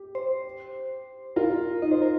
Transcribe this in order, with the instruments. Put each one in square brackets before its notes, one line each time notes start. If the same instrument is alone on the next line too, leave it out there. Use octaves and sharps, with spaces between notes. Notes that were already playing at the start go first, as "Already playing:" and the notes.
Already playing: [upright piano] G4
[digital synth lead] C5
[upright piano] F4 [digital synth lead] A#4
[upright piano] D#4 [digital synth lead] D#5
[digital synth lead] C5
A#4